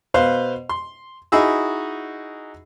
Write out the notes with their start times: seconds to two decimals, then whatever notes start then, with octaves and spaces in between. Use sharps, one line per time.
0.14 B2 B4 C5 F5 C6
0.69 C6
1.32 D#4 E4 F#4 G#4 B5 E6